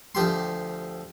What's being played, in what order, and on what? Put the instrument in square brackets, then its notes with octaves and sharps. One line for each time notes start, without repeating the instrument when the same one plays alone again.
[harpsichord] D2 F3 G4 C6